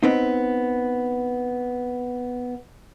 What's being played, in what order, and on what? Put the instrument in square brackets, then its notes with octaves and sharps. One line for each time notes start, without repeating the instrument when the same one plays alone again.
[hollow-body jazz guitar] B3 C4 D#4